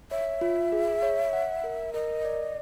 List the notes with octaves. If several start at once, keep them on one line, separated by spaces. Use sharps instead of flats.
C#5 E5
F4
G#4
C#5
F#5
A#4
A#4 D#5
D5